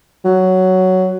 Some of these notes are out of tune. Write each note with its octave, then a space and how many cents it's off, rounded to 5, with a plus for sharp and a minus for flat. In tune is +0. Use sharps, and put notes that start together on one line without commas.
F#3 +5